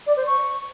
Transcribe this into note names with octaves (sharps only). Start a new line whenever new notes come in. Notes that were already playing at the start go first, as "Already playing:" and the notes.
D5
C5
C#6